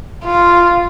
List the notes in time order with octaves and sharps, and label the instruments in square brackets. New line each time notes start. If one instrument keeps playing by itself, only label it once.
[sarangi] F4